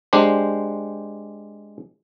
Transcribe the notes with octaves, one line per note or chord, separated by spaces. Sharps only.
G#3 D4 G4 C5